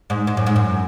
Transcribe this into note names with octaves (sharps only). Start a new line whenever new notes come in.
G#2
G#2
F#2
G#2
F#2